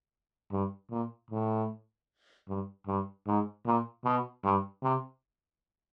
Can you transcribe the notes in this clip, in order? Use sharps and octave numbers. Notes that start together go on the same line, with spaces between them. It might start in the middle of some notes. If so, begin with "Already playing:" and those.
G2
A#2
A2
G2
G2
G#2
A#2
B2
G2
C3